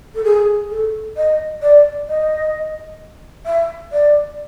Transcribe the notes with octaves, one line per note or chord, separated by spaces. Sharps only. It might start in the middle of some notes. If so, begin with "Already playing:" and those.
A4
G#4
A4
D#5
D5
D#5
E5
D5